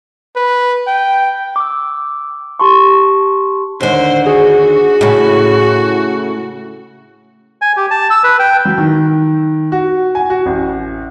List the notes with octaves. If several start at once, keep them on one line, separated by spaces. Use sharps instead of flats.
B4
G5
D6 E6
G4 A5 C6 C#6
D#2 D3 C5
F#4 G#4
A2 C#3
G#5
G4
A5
E6
B4
G5
F#3
D#3
F#4
G#5
F#4
A1